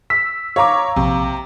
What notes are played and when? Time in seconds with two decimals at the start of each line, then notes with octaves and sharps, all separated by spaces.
0.10 E6 B6
0.56 C#5 F5 A#5 D6
0.96 A#1 C3